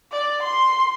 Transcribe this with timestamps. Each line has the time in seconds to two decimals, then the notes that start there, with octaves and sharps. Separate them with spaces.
0.12 D5
0.43 C6